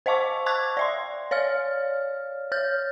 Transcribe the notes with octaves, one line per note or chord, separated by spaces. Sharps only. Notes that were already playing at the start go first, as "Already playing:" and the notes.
C5 D#5 F5 A5 C#6 D6
A5 C#6 D6 F#6 G#6
D5 E5 C6
C#5 D5 F5 F6
C#5 F6 G6